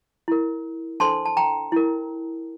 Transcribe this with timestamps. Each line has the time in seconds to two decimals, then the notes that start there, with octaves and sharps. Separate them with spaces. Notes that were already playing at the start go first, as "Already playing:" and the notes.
0.28 E4 A#4
1.00 D4 A4 C5 A5 C6
1.26 A5
1.37 G5 A#5
1.72 E4 A#4